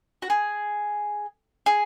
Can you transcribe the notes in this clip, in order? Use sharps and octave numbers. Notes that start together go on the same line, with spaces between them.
F#4
G#4
G#4